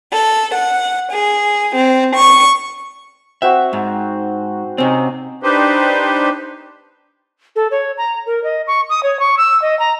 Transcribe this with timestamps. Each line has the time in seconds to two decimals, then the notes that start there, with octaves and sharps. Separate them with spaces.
0.12 A4
0.55 F#5
1.12 G#4
1.76 C4
2.15 C#6
3.42 C4 F#4 C5 E5
3.73 G#2
4.78 C3 C4 C#4 D#4
5.43 D4 D#4 G4 B4 C5
7.56 A4
7.71 C#5
7.97 A#5
8.26 A#4
8.44 D#5
8.67 C#6
8.89 D#6
9.03 C#5
9.19 C#6
9.37 E6
9.62 D#5
9.79 A#5